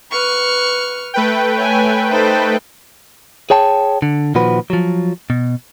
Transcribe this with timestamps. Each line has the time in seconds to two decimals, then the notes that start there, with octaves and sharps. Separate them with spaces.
0.11 B4 C#6 F6
1.14 A3 B4 G5
1.58 C#5 G#5
2.10 D#4 A4 C5
3.50 G#4 C#5 G5 A5
4.02 D3
4.35 A#2 D#3 F3 F#4 B4
4.70 F3 F#3
5.30 B2